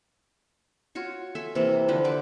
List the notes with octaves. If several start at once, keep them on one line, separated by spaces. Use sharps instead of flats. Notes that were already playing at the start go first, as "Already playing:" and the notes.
F4 F#4 C#5 C#6
A4 E5 G#5
C3 E3 A#3 A4
D3 F3 B4
B4 C5 D5 F#5